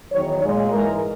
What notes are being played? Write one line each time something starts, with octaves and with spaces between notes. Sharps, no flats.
E2 D#3 F#3 C#5
A#2 G#3 C#5
G#2 E3 G#3 A#4